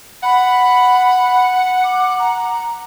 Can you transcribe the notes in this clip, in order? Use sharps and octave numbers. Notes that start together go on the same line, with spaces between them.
F#5 B5
D6
A#5